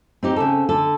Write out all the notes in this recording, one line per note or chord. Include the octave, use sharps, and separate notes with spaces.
C4 D#4 G4
C#3 C4 A4
D3 A4